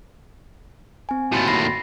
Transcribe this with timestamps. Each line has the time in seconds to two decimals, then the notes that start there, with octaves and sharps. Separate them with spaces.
1.09 C4 G#5
1.32 D#2 A2 F#4 C6 A6
1.48 B5 A#6 C7